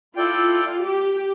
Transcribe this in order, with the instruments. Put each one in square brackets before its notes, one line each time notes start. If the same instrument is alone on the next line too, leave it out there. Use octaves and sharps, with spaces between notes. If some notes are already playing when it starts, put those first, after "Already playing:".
[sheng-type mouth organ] E4 A4 D5 G5 [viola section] F4
[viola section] G4